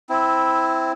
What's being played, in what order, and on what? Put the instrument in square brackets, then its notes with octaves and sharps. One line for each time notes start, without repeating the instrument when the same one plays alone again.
[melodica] C4 E4